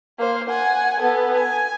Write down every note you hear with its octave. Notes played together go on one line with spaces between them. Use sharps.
A#3 C5
F#5 G#5
B3 A4
G#5